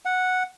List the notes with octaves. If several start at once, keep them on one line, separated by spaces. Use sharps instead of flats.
F#5